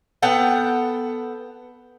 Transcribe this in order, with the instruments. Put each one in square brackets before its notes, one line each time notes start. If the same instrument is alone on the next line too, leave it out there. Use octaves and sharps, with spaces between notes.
[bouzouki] B3 A4 F#5 G5